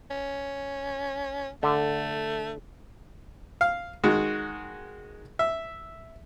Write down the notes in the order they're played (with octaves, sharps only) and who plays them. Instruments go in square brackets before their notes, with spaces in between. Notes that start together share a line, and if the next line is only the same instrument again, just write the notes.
[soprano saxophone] C#4
[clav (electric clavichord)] D3 [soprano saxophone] A3
[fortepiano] F5
D#3 G#3 F#4
E5